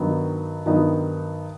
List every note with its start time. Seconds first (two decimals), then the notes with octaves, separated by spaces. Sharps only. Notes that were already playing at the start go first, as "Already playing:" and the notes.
Already playing: G2 D#3 F#3 B3 D#4
0.66 G2 D#3 F#3 B3 D#4